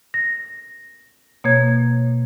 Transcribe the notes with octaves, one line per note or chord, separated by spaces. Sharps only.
A#6
B2 A#3 C#5 G#6